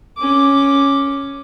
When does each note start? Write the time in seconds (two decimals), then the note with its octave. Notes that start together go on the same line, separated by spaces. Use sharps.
0.17 C#4 D6